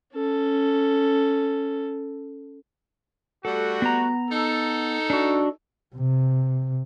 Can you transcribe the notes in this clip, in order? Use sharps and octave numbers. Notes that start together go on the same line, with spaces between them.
C#4 A4
G3 A3 F#4 A4
B3 A#5
D#4 A4
D4 F#4
C3